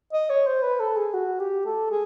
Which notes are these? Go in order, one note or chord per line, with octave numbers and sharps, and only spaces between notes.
D#5
C#5
C5
B4
A4
G#4
F#4
G4
A4
G#4